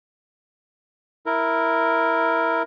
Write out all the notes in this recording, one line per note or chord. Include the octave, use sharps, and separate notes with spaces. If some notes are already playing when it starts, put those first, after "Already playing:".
E4 A#4